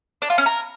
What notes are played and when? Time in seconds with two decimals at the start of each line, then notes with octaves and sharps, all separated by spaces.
0.22 D4
0.30 F4
0.38 C#4
0.46 A#4